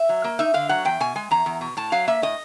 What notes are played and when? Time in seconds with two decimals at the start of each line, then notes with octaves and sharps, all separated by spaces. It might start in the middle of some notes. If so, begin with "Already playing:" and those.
Already playing: E5
0.09 F#3
0.24 A#3
0.39 D#4 E5
0.54 D3 F5
0.69 F#3 F#5
0.85 E2 G5
1.00 B2 G#5
1.16 G#3 G#5
1.31 E2 A#5
1.46 E2
1.61 B2
1.77 A2 A5
1.92 F#3 F5
2.07 A#3 E5
2.22 A2 D#5